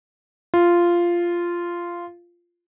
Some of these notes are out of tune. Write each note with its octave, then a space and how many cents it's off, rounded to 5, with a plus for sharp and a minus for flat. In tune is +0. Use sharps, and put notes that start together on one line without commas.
F4 -10